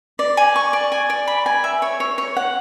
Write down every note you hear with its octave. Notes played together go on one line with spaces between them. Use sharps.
D5
G#5
C#6
D5
G#5
D5
B5
G#5
E5
C#5
C#5
C#5
F#5